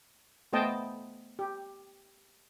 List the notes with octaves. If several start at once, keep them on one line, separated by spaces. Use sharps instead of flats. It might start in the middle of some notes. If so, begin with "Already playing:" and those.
A3 B3 C5 D#5 G5 A5
G4